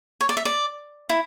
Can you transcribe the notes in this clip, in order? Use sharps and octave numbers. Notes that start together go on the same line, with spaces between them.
C#5
D5
E5
D5
E4